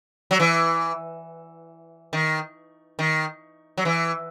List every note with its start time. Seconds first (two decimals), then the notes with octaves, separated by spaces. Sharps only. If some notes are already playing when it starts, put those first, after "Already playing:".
0.31 F#3
0.40 E3
2.13 D#3
2.99 D#3
3.78 F#3
3.85 E3